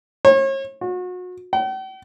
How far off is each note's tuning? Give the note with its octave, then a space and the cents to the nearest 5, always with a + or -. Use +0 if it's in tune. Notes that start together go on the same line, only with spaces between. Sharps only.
C#5 -40
F#4 -35
G5 -45